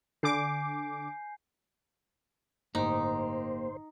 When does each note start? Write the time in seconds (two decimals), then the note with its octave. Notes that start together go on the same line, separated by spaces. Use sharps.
0.23 D3 G#5 D6 G6 C7
2.75 G1 A2 A#3 D#4 G4 C5